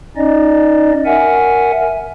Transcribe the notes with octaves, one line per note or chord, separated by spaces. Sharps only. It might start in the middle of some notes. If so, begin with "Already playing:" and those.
C#4 D#4 D5 D#5
A#4 E5 F#5 G#5